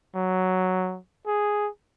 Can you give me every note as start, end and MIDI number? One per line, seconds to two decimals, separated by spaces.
0.15 0.99 54
1.26 1.69 68